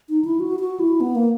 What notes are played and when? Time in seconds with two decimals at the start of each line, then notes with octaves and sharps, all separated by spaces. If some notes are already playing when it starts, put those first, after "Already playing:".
0.09 D#4
0.24 E4
0.40 F#4
0.60 F#4
0.80 E4
1.00 B3
1.15 A#3